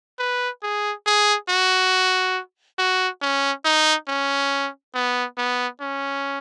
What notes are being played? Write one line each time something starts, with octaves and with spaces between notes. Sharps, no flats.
B4
G#4
G#4
F#4
F#4
C#4
D#4
C#4
B3
B3
C#4